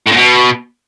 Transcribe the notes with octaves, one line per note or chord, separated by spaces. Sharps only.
A2
A#2
B2